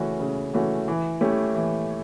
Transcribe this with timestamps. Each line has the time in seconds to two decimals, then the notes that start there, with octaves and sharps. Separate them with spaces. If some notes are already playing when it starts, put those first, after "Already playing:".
Already playing: C#3 E3 A3 C#4 F#4
0.20 C#3
0.54 E3 A3 C#4 F#4
0.88 E3
1.21 A3 C#4 E4 G4
1.54 E3